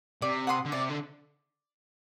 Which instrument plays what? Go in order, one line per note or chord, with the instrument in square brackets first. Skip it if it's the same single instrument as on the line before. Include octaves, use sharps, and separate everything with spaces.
[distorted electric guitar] C3 [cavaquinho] D5
[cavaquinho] F#5 C6 D#6
[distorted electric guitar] D3
[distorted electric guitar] C3 [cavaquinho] D5
[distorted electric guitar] D3